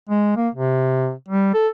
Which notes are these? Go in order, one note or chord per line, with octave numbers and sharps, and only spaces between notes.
G#3
A#3
C3
G3
A4